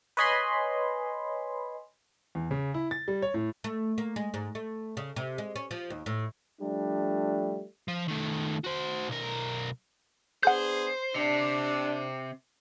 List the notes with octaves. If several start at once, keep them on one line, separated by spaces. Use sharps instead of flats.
B4 C#5 D#5 G#5 B5 C6
E2
C#3
E4
A6
G3
C#5
A2
A3
A#3
G#3
G#2
A3
C#3
C3
G#3
C#4
F3
D#2
A2
F3 G3 A3 D4
F3
D#3 A3
F#4 C5
B1 A#4
B3 D4 G#4 C5 F#5 G6
C3 D4